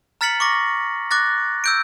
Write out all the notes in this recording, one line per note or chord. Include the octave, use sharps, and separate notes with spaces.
A#5 F6 A6 B6 C#7 F#7
C#6 D6 A#6
D6 F#6 A6 A#6
E6 G6 D7